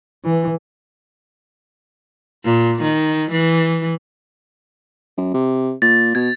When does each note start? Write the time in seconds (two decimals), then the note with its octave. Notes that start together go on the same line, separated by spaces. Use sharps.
0.25 E3
2.45 A#2
2.83 D#3
3.31 E3
5.18 F#2
5.34 C3
5.82 A#2 A6
6.15 B2 G#6